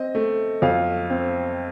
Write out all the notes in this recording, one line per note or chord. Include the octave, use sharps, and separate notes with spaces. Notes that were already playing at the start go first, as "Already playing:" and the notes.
Already playing: C4 D#5
A3
F2 F5
C4